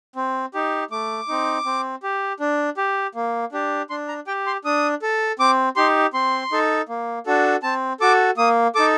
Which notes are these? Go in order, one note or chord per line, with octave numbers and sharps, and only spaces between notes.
C4
D#4 G4
A3 D6
C4 D#4
C4
G4
D4
G4
A#3
D4 G4
D4 C6
A#5
G4 G5
C6
D4 D#6
A4
C4 D6
D#4 G4 C6
C4 C6
D#4 A4
A#3
D4 F#4 A4
C4 A5
F#4 A4 D6
A#3 D#6
D#4 A4 D6